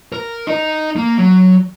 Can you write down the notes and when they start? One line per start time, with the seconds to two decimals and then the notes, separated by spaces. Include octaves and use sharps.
0.12 A#4
0.47 D#4 D#5
0.96 A#3
1.18 F#3